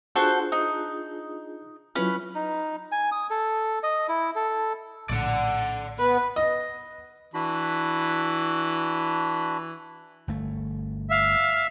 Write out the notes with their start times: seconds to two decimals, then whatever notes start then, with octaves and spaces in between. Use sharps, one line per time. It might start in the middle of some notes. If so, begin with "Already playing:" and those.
0.16 D4 F4 F#4 G#4 A4 C5
0.52 D#4
1.95 F#3 C#4 E4 F4 B4
2.35 D#4
2.92 G#5
3.12 D#6
3.30 A4
3.83 D#5
4.09 E4
4.36 A4
5.09 A#1 A2 D3 D5 F#5
5.99 B3 B4
6.36 D#5
7.34 E3 D4 F#4 B5
10.28 G1 A3
11.10 E5 F5